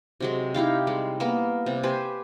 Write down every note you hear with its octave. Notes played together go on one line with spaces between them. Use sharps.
C3 F#3 G#3
D#4 E4 G4 F5
G3 G#3
A#3 B3 A#4
C3 G3
G4 B4 C5 G#5